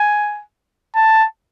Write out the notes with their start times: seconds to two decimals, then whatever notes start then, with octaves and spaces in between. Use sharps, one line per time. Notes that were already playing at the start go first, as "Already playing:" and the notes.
Already playing: G#5
0.95 A5